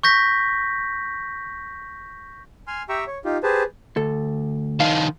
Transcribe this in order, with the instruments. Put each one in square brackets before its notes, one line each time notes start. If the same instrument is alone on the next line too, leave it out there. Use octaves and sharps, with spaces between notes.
[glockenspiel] C#6 G6 A#6 B6
[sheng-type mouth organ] G#5 C6 F6
G4 E5 G5 A#5 C#6 E6
C#5
D#4 F4 G4
G4 G#4 B4 C5 A5
[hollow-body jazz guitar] D2 A4
[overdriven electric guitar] D#3 F3 [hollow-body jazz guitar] F5